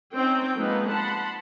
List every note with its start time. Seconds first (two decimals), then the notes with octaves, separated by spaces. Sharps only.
0.15 C4 C#4 D#4 G5
0.57 F3 G#3 A#3 B3 D#4 B4
0.90 F#5 A5 B5 C6